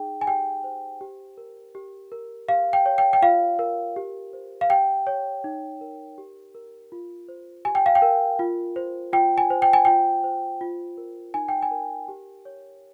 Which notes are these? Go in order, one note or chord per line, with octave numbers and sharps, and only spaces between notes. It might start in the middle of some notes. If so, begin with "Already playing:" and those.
Already playing: D#4 G#4 G5
G#5
G4 G5
C5
G4
A#4
G4
A#4
G4 F5
G5
C#5
G5
G5
F4 F5
A#4
G4
C5
F5
G4 G5
C#5
D#4
A#4
G4
A#4
F4
C5
G4 G#5
G5
F5
G5
A#4
F4
C5
F4 G5
G#5
C5
G5
G#5
F4 G5
C5
F4
A#4
D#4 G#5
G5
G#5
A#4
G4
C#5